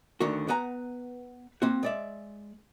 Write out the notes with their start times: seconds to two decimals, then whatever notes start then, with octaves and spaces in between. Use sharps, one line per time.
0.20 D2 D3 D#3 F#4
0.48 B3 B4 F#5 G#5 A#5
1.62 A#3 C4 F#4
1.83 G#3 D5 E5